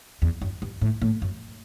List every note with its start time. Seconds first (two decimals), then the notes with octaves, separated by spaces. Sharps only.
0.22 E2
0.42 F#2
0.62 G2
0.81 A2
1.02 A2
1.22 F#2